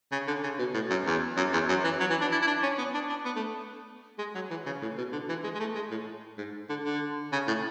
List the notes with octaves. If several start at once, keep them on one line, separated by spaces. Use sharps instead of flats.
C#3
D3
C#3
B2
A2
F#2
E2
F#2
E2
F#2
E3
F#3
E3
D4
E4
E4
D4
C#4
B3
D4
D4
B3
A3
G#3
F#3
E3
C#3
A2
B2
D3
E3
G#3
G#3
A3
G#3
A2
G#2
D3
D3
C#3
A2